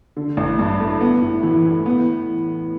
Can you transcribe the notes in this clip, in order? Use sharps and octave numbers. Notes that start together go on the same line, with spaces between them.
D3
A1
G2
A3
B3
A2
E3
A2
B3